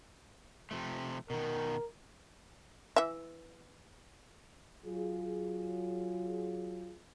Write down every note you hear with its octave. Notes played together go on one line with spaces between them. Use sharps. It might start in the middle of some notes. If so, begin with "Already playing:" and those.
C3 F3 A3
B2 D#3 A#4
E3 E5
F#3 F4 G#4